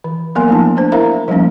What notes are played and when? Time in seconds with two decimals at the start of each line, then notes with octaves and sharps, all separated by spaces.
0.04 E3
0.35 F#3 A#3 B3 A#4 G#5 C6
0.48 F3 A3 D4 E4 A5
0.76 A3 D4 C5
0.92 E4 A#4 C5 E5 F5 A#5
1.28 F3 G3 A3 A#3 C#4 D#4